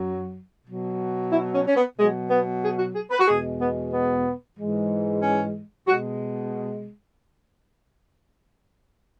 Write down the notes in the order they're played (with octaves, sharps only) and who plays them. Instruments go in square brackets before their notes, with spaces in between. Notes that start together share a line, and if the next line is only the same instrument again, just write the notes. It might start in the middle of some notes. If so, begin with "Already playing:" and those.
Already playing: [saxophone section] F#2 F#3
B2 F#3
E4
C#4
C#4
B3
B2 F#3 G#3
B3
G#4
F#4
G#4
B4
F#4
E2 B2 G#3 G#4
B3
B3
G#2 E3 G#3
C#4
B2 G#3 F#4